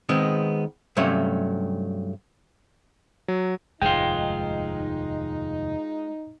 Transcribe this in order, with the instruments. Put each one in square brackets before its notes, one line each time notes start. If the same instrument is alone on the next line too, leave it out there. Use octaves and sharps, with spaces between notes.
[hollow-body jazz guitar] D#3 G#3 B3 C4
G2 C3 F#3 A3 C#4 C#5
[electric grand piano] F#3
[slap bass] F1 D#2 G#2 [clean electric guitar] G#3 F4 [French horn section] D#4 [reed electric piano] G5